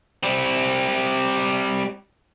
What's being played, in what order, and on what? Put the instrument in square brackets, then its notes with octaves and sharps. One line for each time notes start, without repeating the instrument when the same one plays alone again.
[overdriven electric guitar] G3 C4